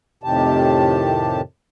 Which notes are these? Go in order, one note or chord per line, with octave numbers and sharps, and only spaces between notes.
F2 A2 C3 D#3 G4 A5